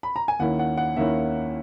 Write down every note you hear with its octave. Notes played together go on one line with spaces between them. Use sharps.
B5
A#5
G#5
D#2 D#3 A#3 C#4 E4 F#5
F#5
F#5
D#2 D#3 A#3 C#4 E4 E5